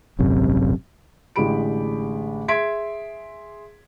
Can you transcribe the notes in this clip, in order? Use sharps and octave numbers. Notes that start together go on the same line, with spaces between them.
D#1 G#1 F#2 C3
A1 D3 G#3 G4 B5 D7
G#4 E5 C6 G#6 B6 D7